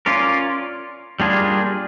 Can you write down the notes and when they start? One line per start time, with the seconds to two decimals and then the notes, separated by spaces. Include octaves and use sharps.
0.06 C#4 F4 A#4 D5
1.20 G3 A#3 D4 F4 G#4